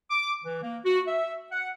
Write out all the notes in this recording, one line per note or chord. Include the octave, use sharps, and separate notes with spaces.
D6
E3
A#3
F#4
E5
F#5